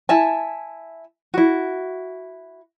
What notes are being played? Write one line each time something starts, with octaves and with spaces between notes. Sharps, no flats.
E4 E5 G#5 A5
E4 F#4